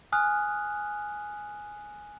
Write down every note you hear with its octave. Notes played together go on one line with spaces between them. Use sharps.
G#5 D#6 F6 F#6